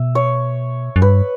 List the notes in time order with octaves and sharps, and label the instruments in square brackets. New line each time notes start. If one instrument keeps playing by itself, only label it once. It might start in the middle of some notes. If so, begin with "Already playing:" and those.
Already playing: [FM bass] B2 [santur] E5
[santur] C#5
[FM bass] F#2
[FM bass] G2 [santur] B4